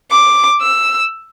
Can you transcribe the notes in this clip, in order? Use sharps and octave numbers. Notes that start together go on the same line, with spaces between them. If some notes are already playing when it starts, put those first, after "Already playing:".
D6
E6